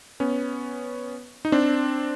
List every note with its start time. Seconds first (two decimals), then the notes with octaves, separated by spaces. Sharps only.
0.20 B3 C#4
1.45 D#4
1.52 C4 D4